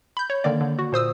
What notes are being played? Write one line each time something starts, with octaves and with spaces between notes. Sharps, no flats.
B5 G6
C#5
D3 D#3 A#3 D5
D3
F#4
A#2 C5 D#6 E6